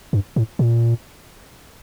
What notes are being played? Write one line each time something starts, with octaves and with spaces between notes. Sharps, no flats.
G2
A2
A#2